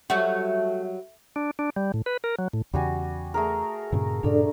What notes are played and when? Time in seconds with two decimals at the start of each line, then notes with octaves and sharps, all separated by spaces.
0.10 F#3 G3 A3 F#4
1.36 D4
1.59 D4
1.76 G3
1.94 A2
2.06 B4
2.24 A#4
2.39 F#3
2.53 A2
2.73 E2 C#3 G3 F#4 G#5
3.34 A3 G#4 A#4
3.92 G2 A#2 C#3
4.23 G2 A#2 C#3 D4 A4 D5